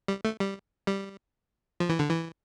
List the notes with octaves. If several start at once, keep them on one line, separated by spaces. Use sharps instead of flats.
G3
A3
G3
G3
F3
E3
D3
E3